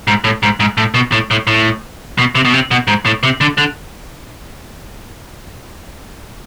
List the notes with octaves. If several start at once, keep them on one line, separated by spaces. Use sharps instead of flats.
G#2
A2
G#2
G#2
A2
B2
A2
A2
A2
B2
C3
B2
C3
B2
G#2
A2
C3
D3
D3